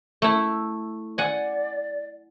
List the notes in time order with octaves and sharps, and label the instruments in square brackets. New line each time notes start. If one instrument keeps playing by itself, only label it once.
[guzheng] A3 E4
[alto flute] D5 [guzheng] F#5 G#5